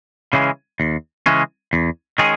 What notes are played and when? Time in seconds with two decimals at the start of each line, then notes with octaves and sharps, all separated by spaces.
0.33 C#3 E3 G#3 C#4
0.80 D#2
1.26 C#3 E3 G#3 C#4
1.73 E2
2.18 D#3 G#3 C#4 G#4